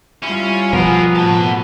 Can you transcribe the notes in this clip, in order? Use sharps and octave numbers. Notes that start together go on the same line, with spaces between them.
G3 C#4 E4 F4
B2 F3 B3 G#4 A#4
A2 F#4 A5